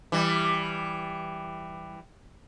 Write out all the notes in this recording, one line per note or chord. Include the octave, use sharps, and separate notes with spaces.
E3 G3